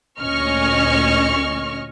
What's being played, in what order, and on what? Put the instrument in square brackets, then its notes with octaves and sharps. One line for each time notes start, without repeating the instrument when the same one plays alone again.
[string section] D2 A#2 C#4 D#5 C#6 F6